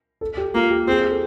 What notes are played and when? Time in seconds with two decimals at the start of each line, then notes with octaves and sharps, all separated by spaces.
0.21 A4
0.37 G4
0.54 A#3 F4
0.70 G4
0.88 C4 G#4
0.99 G#4
1.10 A4